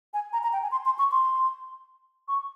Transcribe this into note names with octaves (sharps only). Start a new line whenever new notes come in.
G#5
A#5
A#5
G5
G#5
C6
C6
C#6
C6
C#6